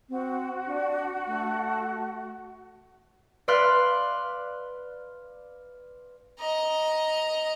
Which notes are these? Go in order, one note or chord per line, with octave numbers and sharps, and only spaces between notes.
C4 F#4
D4
A3
B4 D5 F5 C6 F6 F#6
D#5 A#5